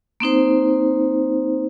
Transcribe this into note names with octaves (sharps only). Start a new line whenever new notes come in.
A#3 C4 D#4 C5